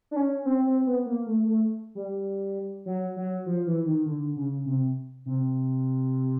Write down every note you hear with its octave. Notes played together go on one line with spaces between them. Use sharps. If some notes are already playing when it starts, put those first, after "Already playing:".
D4
C#4
C4
C4
B3
A#3
A3
A3
G3
F#3
F#3
F3
E3
D#3
D3
C#3
C3
C3